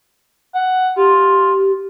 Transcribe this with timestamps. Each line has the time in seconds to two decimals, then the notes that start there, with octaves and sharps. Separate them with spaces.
0.55 F#5
0.97 F4 G4